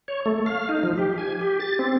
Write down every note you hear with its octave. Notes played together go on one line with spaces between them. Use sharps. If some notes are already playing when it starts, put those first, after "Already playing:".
C#5
A3
F5
D#4
F3
G4
G#5
G4
A6
C4